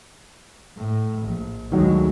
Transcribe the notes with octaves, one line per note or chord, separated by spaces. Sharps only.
A2
A#1
D2 D#3 F#3 G#3